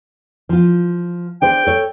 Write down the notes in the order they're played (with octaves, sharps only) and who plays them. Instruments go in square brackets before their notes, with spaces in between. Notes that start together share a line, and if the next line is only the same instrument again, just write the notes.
[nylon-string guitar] F3 F4
[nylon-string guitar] D4 G#4 C5 [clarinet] G5
[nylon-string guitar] A4 C#5